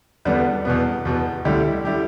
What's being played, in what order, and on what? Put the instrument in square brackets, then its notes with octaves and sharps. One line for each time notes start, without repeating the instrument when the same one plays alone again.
[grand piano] E2 D3 G3 B3 D4
E2 B2 B3
E2 B2 B3
D2 D3 G3 E4 G4
D3 G3 E4 G4